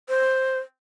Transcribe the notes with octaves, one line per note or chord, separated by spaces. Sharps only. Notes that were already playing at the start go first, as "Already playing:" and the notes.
C5